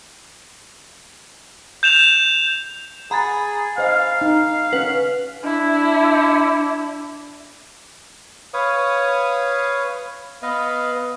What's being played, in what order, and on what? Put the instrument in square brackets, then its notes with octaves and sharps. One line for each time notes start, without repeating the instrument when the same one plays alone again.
[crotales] G6 E7 F7
[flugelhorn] G#4 [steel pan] F#5 [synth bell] A#5 B5 A6
[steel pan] C5 D#5 G#5 [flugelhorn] F5
[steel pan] D#4
[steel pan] C#4 F#5 [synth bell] B4
[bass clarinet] D4 [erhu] E4
[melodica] B4 C#5 F5 D#6
B3 B4 D#5 F5